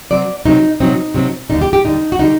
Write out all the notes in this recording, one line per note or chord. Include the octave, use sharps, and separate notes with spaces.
C3 F#3 C4 D5
C3 F#3 C4 D#4
C3 F#3 C4 D#4
C3 F#3 C4
D#2 D3 G3 D#4
G4
G4
D#2 D3 G3 D#4
F#4
D3 G3 D#4